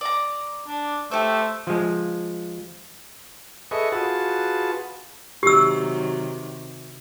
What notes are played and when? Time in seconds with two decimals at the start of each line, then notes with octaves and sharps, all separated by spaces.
0.01 D5 A#5
0.67 D4
1.11 A3 G4 C5
1.67 F3 G#3
3.71 G#4 A4 B4 D#5 E5 C#6
3.92 F4 F#4 G#4 B4 A5
5.43 C3 D#3 F#3 G4 E6